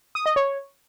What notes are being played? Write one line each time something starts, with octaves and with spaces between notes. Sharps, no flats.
D#6
D#5
C#5